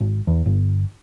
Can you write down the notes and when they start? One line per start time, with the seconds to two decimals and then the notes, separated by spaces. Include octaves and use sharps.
0.01 G#1
0.27 E2
0.46 G1